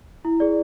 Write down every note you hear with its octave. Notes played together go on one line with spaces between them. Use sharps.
E4
G#4 D5